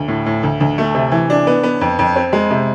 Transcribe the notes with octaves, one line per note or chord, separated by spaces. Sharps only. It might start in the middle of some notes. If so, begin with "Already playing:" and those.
Already playing: D2
A2
A2
D2
D2
A3
C3
E3
D4
B3
B3
F2
F2
C4
G#3
C3